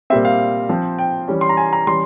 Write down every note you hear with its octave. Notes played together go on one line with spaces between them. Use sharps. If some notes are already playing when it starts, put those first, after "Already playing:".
A#2 G3 C4 E5
F5
F3 C4
G5
E3 G3 C#4
C6
A#5
G#5
A#5
E3 G3 C#4 C6